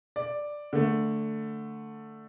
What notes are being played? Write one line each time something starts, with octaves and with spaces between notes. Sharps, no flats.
D5
D3 A3